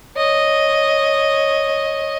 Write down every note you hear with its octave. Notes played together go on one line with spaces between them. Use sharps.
C#5 D#5